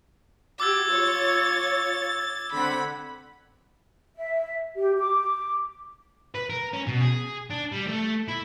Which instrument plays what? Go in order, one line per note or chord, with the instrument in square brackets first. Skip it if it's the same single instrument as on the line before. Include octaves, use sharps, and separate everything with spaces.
[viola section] F#4 G4 [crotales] D6 E6 G#6 [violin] A6
[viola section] F4 C#5
[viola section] D3 C4 F#5 [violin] B5
[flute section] E5
G4
D6
[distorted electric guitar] B4
A#4
C#4
B2
G#4
D4
G3
A3
E4